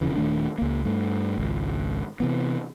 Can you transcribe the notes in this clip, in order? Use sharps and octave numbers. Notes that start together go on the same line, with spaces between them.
E1 F2 C#3 E3
D#1 D#3 A3 D4
C#2 A#3
G2 A3
G#1 C#2
C3 E3 B3